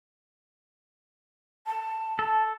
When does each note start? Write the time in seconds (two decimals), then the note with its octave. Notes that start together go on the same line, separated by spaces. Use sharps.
1.67 A5
2.19 A4